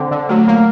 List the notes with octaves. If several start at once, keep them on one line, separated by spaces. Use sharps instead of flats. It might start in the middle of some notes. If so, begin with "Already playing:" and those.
Already playing: D3 C4
D3
F#3 A3
A#3